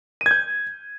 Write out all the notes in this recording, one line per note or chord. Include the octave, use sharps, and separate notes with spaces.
G6 G#6 D#7